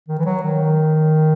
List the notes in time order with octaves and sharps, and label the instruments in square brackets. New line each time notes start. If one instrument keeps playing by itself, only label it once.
[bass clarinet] D#3
E3
F#3
D#3